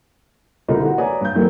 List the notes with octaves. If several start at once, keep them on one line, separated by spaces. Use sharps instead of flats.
C2 D3 D#4 A#4
F#4
B4 C#5 D5 G#5 A#5 D#6
G2 G6
D#3 F#3 A3 A#3 C4